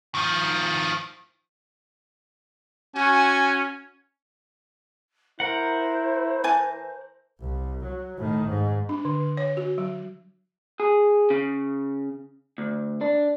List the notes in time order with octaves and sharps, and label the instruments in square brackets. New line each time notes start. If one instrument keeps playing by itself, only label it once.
[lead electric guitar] D#3 F3
[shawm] C#4 [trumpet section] F#4 G#5
[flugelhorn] E4 [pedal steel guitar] A#4 F#5 [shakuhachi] C5
[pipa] E3 G#5 A5
[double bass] C2
F#3
A2 D#3
G#2
[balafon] D4
D3
C#5
F#4
F#3
[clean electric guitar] G#4
C#3
D2
D4